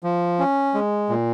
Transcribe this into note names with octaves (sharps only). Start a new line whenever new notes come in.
F3
C#4
G#3
A#2